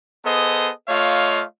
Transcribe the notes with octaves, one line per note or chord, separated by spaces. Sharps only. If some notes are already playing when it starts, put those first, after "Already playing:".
B3 G#4 A4 C5 D#5
A3 F4 C#5 D#5 F5